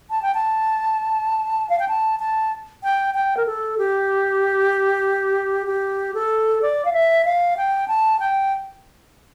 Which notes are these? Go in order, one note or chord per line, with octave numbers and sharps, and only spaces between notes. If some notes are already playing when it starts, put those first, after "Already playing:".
A5
G5
A5
F5
G5
A5
A5
G5
G5
A#4
A4
G4
G4
A4
D5
F5
E5
F5
G5
A5
G5